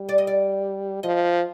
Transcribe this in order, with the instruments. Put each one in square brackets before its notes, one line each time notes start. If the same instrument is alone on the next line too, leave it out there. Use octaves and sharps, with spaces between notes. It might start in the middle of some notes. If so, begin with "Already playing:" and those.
Already playing: [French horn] G3
[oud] D5
D#5
D5
[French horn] F3 [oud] D#5